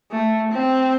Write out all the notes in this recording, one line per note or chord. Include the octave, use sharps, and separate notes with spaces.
A3
C4